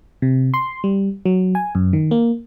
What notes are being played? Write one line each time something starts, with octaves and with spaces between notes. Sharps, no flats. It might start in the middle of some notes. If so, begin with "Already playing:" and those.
C3
C6
G3
F#3
G#5
F#2
D#3
A#3